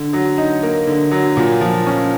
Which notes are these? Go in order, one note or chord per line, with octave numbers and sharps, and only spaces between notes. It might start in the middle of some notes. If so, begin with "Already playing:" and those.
Already playing: D3
F#3
D#4
A#3
D3
F#3
A#2
F3
C#4